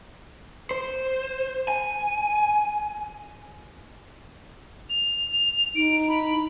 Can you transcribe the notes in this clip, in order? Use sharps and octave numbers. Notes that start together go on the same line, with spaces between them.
C5
G#5
F7
D#4 D7
B5